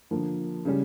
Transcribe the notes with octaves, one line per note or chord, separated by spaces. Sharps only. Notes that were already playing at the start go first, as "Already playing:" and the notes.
D3 F3 A#3
C#3 G3 C#4